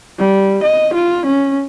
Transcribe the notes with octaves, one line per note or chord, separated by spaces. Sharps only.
G3
D#5
F4
C#4